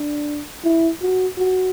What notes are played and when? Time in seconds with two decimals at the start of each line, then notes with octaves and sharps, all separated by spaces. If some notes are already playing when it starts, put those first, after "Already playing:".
Already playing: D4
0.64 E4
1.01 F#4
1.38 F#4